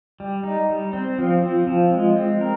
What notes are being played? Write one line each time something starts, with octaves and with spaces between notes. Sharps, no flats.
G3
D#4
G3
C4
F3
C4
F3
G#3
C4
A#4